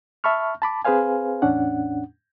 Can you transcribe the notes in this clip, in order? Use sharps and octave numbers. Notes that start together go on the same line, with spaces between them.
E5 A5 B5 C#6 F6
A5 B5 D6
C4 G#4 B4 C5 F5 G#5
E2 A2 C#4 D4 F#5